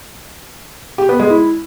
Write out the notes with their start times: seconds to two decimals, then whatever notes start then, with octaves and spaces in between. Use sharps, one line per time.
0.98 G4
1.09 B3
1.20 G#3
1.30 E4